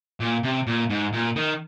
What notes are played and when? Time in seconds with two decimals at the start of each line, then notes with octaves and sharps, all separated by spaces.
0.20 A#2
0.43 C3
0.67 A#2
0.90 G#2
1.13 A#2
1.36 D#3